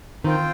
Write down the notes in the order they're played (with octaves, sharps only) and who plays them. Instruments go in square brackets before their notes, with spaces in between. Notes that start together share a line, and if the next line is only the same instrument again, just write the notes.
[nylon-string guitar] D#3 [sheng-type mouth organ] C4 F4 C5 G5